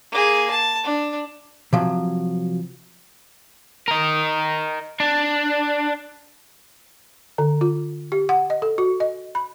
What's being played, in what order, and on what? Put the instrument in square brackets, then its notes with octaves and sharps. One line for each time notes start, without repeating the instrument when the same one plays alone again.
[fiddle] A#3 G#4
A5
D4
[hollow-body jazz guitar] C3 F3 F#3
[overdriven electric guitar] A#4 D#5
D4
[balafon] D3
F4
G4
F#5
D#5
A4
F#4
D#5
B5